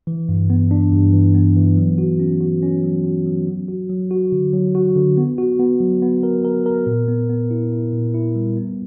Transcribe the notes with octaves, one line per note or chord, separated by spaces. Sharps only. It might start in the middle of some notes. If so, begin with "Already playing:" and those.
E3
G2
B3
D4
G2
E3
B3
E3
F#3
F#4
C#4
F#4
C#4
F#3
F#4
F#3
F#3
F#4
F#3
F#4
D3
F#3
F#4
D3
B3
F#4
B3
F#3
B3
A#4
A#4
A#4
A#2
B3
B3
E4
E4
A#2
E4
G3
B3